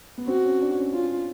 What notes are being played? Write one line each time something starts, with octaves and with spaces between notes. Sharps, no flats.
B3
C4 F#4
C#4
D4
C#4
C#4 F4